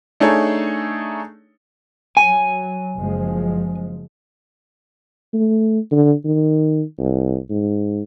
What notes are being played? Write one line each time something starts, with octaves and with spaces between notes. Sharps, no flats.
A3 D4 D#4 G#4 A4 C#5
F#3 G#5
F#1 F3 G#3
A3
D3
D#3
C2
G#2